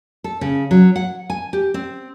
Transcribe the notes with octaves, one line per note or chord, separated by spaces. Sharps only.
A4
C#3
F#3
F#5
G#5
G4
C4